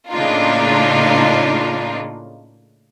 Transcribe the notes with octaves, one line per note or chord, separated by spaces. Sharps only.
A2 C#3 A#3 D4 D#4 F4